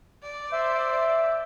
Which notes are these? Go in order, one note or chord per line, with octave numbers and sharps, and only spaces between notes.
D5
C5 E5